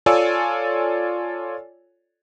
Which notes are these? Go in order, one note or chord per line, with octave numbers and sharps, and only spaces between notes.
F4 A4 C#5 D5 G#5 E6